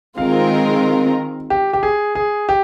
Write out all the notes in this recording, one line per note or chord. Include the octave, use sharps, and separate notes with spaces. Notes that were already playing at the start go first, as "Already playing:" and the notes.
D#3 G#3 C4 F4 A#4 F5
G4
G4
G#4
G#4
G4